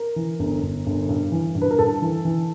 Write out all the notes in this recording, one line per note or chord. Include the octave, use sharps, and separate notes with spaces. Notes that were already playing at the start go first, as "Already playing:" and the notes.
Already playing: A#4
E3
G1
G1
G1
G2
E3
G2
B4
A#4
G2 A4
E3
E3